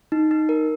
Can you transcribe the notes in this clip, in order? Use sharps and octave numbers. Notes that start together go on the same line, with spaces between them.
D#4
D#4
A#4